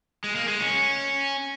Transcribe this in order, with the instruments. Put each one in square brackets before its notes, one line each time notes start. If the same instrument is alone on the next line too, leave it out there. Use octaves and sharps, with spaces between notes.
[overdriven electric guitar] G#3
A#3
G#3
C#4